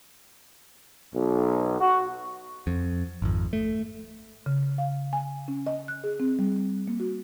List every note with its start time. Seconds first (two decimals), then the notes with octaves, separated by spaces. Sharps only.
1.15 B1
1.81 F#4
2.67 F2
3.22 G#1 F2
3.53 A3
4.46 C#3
4.78 F5
5.13 G#5
5.48 C#4
5.67 D#5
5.88 F#6
6.04 G#4
6.20 C4
6.39 G3
6.88 A#3
7.00 F#4